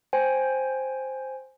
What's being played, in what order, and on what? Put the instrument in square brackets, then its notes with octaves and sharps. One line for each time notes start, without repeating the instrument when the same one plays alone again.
[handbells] C5 G5 G#5